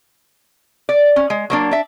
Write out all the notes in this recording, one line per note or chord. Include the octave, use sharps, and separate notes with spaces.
D5
C#4
G#3
F#3 A#3 D4
D4 E5